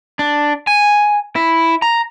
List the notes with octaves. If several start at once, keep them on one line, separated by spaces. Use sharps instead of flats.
D4
G#5
E4
A#5